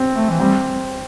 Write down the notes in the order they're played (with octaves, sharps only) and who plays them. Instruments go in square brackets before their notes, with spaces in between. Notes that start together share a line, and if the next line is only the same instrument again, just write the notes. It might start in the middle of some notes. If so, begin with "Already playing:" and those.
Already playing: [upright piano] C4
[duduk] A3
E3
[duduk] G3 [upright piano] C4